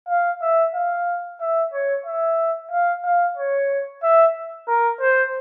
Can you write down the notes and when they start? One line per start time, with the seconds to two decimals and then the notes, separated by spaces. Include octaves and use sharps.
0.09 F5
0.41 E5
0.74 F5
1.41 E5
1.73 C#5
2.06 E5
2.71 F5
3.05 F5
3.37 C#5
4.03 E5
4.68 A#4
5.01 C5